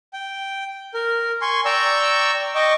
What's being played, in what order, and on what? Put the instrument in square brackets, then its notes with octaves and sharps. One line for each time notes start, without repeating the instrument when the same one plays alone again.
[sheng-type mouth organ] G5
A#4
G#5 C6 C#6
D5 G5 A#5 C#6 E6
D#5 G5 C#6 D6